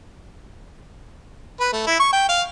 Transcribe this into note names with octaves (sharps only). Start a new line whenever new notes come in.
B4
A3
E4
C#6
G5
F5